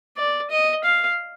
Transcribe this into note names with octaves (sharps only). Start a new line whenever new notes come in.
D5
D#5
F5